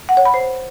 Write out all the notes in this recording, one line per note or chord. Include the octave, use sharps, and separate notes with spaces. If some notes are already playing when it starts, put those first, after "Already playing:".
F#5
C#5
B5
C5